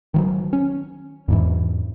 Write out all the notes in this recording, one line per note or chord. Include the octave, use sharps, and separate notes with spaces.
D#3 F3 F#3
C#4
E2 G#2 E3